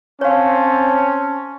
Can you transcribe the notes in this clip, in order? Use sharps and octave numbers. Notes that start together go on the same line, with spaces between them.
C4 C#4 C#5 F5 A5